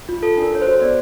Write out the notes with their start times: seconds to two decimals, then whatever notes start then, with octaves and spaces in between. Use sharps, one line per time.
0.09 F4
0.23 A4
0.37 D4 A#4
0.52 A4 C#5
0.62 C5
0.67 F#4
0.81 B3 D5